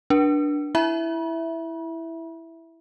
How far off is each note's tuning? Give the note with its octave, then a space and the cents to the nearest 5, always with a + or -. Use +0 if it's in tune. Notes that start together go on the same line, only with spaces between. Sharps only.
D4 +0 B4 -45
E4 +0 E5 +0 B5 -40